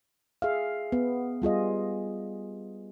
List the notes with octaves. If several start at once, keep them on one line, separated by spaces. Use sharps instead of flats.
G#4 E5 F5
B3
G3 F4 G#4 D#5